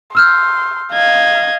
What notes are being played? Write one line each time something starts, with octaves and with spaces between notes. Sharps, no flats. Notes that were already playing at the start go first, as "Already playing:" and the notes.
C6 E6 F6 G6
D#5 F5 G#6